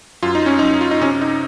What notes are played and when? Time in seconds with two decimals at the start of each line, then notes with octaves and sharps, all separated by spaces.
0.23 F#2 F4
0.35 D#4
0.46 C#4
0.59 F#2 D#4
0.81 F4
0.91 D#4
1.01 C3 C#4
1.21 D#4